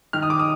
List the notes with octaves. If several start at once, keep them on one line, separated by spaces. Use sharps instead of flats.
D#3 F6
D#6
D6
D#6